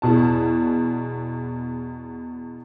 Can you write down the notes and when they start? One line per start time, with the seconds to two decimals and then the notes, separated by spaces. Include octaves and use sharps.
0.02 E2 B2 A5